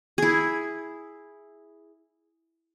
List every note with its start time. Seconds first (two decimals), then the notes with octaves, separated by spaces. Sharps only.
0.18 E4 G#4